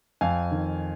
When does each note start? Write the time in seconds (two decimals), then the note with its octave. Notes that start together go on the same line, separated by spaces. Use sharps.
0.21 F2 F5 G#5
0.51 D#3